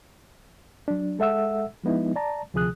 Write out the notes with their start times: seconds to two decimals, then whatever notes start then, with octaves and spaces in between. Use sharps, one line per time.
0.88 F#3 D4
1.19 G#3 A4 E5 F#5 E6
1.84 F3 G#3 B3 D#4 E4
2.16 D5 A5 A#5
2.54 D2 C3 F3 G#4 D#6 F#6